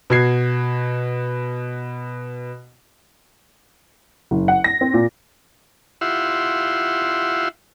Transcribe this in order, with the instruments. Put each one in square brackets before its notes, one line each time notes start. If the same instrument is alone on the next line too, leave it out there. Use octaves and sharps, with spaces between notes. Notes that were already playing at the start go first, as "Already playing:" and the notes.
[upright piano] B2 F#4 G#6 C7
[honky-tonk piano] F#1
F#5
A#6
C4
A#2
[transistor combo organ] E4 F4 G4 E5 F#5 C6